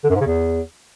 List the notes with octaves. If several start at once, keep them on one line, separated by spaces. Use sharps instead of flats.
D3
F#2
G#2
C#3
E2